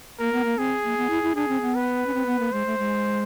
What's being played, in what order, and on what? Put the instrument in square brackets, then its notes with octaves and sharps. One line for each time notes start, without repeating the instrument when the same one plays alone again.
[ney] A#3 [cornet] A#4
[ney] B3
A#3
[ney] C4 [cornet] G#4
[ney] A#3
B3
E4
E4
[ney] D4 [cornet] G#4
[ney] C4
B3
[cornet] B4
[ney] C#4
C4
B3
A#3
[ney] G#3 [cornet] C5
[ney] A3
G#3